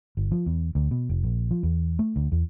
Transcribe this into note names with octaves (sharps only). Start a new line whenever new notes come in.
G1
F3
E2
D2
B2
F1
A#1
F3
E2
A3
D2
E2